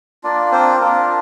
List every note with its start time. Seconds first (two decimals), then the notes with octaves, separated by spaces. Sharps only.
0.24 A#3 D4 F4 D5
0.52 C4 C5
0.80 A#3 D4 F4 A#4